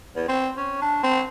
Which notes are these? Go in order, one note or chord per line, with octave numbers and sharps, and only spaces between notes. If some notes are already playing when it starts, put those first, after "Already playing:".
E2
C4
C#4
D4
C4